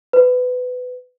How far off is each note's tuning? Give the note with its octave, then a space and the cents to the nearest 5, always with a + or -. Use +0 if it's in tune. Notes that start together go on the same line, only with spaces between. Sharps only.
B4 +20